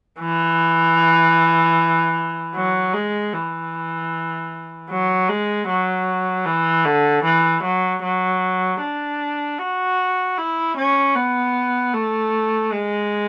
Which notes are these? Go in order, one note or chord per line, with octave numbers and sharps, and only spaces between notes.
E3
F#3
G#3
E3
F#3
G#3
F#3
E3
D3
E3
F#3
F#3
D4
F#4
E4
C#4
B3
A3
G#3